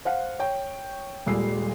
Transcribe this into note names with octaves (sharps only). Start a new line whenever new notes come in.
C5 F5 F#5
C#5 G5
D#1 A#2 G3 G#3 E6 C7